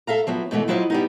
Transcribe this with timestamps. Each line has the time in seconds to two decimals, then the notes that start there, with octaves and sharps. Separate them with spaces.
0.07 A4 E5 F5 A#5
0.27 F3 F#3 B3
0.51 G#2 B2 E3 A3
0.68 F3 F#3 E4 F4 C5 D#5
0.90 G3 B3 D#4